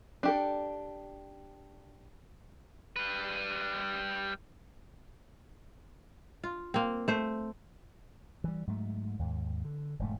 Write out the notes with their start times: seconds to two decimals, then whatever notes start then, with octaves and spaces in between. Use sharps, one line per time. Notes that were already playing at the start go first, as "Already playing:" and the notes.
0.23 D4 G4 A4
2.96 G3 B4
6.44 F4
6.74 A#3 C4
7.08 A3 C5
8.44 E3 G3
8.67 G#2 F#3 A3
9.19 D#2 G#2
9.65 D3
9.99 E1 G#2 A3